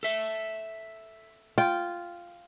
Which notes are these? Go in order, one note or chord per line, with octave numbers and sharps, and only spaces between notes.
A4 E5
F4 G5